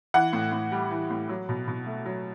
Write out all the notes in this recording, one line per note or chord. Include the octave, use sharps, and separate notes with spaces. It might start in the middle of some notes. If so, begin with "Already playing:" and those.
E3 F#5
A2
A2
G3
E3
A2
F#3
B2
B2
A3
F#3